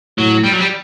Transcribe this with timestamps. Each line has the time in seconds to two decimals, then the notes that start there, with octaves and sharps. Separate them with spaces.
0.18 A2 F#3
0.44 G3
0.52 F#3
0.59 G3